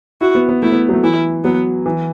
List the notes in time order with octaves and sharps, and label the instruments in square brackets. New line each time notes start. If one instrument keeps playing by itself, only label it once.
[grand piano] E4 [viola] F#4
[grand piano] B3
B3
[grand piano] A3 [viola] E4
[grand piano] B3
F#3
A3
[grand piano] E3 [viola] E4
[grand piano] F#3 [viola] B3
[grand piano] E3